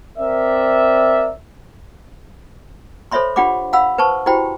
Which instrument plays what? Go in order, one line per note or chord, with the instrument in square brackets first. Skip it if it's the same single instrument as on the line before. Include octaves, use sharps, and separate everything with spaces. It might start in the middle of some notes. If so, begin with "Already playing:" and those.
[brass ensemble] C4 A#4 D5 E5
[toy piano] A4 C5 C#5 E5 B5 C6
D4 F4 G4 F#5 B5 D6
F5 F#5 B5 E6
B4 C5 A5 C#6
E4 F#4 G4 C5 G5 B5